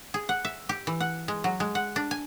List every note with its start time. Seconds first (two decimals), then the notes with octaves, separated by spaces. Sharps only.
0.14 G#4
0.29 F#5
0.45 E5
0.69 G4
0.87 E3
1.00 F#5
1.28 G#3
1.44 F#3
1.60 G#3
1.75 F#5
1.96 D4
2.11 G#5